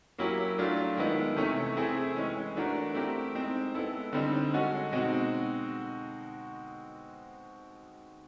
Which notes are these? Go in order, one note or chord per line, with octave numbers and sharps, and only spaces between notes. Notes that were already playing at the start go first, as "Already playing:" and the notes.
F#3 A#3 C#4 E4 G4
F#3 A3 D4 F4
D#3 G#3 B3 E4
C3 E3 A3 C#4
A3 C4 E4 G#4
E3 G#3 C#4
E3 A3 D4 F#4 A#4
A3 C4 E4 G4 A#4
G#3 C4 D#4
G#3 B3 E4 A4
D3 G3 C4 D#4
G#3 C#4 F#4 A4
B2 G#3 C4 D#4 F#4